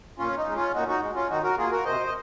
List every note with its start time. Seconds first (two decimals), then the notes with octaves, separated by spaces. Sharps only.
0.18 A#2 C#4 F4
0.37 D#4
0.46 G#3
0.55 C#4 F4
0.74 A#2 D#4 F#4
0.88 D#4 F#4
1.01 G#3
1.15 C#4 F4
1.30 D#3 D#4 F#4
1.43 F#4 A#4
1.58 A#3 F4 G#4
1.72 F#4 A#4
1.85 C3 C5 D#5
2.06 D#5